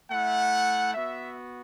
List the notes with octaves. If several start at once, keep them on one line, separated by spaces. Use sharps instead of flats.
A3 E4 F#5
B3 F#4 E5